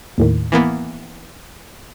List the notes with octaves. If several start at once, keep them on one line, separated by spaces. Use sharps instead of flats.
D#2 A2 D#3
E3 A#3 B3